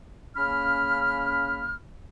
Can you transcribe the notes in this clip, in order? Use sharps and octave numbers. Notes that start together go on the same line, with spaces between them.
C#3 A#3 C#4 B5 F6